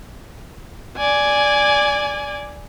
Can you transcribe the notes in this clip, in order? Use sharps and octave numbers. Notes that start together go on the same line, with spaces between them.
D5 G#5